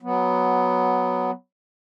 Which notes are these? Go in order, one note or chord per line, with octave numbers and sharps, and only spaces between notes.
F#3 B3